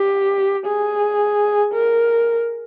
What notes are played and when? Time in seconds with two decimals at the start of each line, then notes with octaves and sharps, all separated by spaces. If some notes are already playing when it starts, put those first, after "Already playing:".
Already playing: G4
0.66 G#4
1.74 A#4